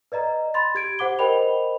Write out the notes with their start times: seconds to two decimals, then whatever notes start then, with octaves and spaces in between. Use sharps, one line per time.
0.12 B4 D5 D#5 A#5
0.54 B5 C6 A6
0.75 G4 G#6 D7
0.99 G4 C5 F#5 D6 G7
1.19 A#4 C5 D#5 G5 B5 F7